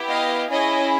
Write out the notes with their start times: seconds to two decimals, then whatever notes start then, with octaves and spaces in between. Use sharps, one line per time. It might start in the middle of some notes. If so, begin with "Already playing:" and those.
Already playing: B3 E4 G4
0.10 D#5 F5
0.51 C#4 E4 G#4 C#5 D#5